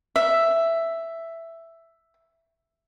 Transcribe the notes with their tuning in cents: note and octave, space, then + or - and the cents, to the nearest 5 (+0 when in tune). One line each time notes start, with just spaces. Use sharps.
E5 +5